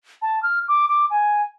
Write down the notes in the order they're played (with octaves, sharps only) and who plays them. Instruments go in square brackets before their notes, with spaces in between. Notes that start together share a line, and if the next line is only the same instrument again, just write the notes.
[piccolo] A5
F6
D6
D6
G#5